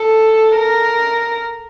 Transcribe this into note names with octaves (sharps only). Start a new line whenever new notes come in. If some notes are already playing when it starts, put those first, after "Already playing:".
Already playing: A4
A#4